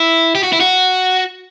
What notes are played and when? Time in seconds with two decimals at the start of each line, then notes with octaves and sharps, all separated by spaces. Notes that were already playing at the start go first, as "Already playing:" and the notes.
Already playing: E4
0.35 G4
0.43 F#4
0.53 E4
0.61 F#4